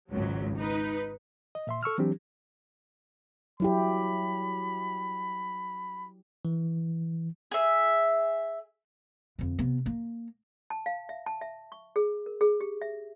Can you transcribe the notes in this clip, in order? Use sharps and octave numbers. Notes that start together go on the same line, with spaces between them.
G#1 C#2 F#3
D#4 B4
D#5
A#2 E5 C6
A4 C#6 E6 F6
E3 F#3 C4 D4 G4
F#3 E4 G4 B5
E3
G#4 E5
F2 D3
C3 B3
A#3
A5
F5
E5
A5
E5
C#6
G#4
A#4
G#4
G4
E5